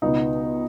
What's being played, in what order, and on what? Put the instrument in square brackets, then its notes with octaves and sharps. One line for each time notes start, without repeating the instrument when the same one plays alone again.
[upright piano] C#2 B2 B3 D#4